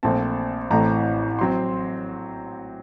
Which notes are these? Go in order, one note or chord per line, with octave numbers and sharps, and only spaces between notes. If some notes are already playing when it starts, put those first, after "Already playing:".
A#1 A#2 A3 C4 A5
A1 A2 A3 C4 A#5
F#3 C4 C6